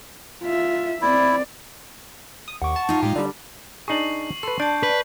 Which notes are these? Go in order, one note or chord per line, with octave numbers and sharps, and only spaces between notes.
F4 E5
C4 E4 D5
D#6
D#2 F#5 C#6 D6
A5
D#4 F4
A2 G#3 G4
D3 G3 D5
D4 D#4 G#4 C#6 C7 F#7
A4 B4 C6
D4 D5 A5 G6
B4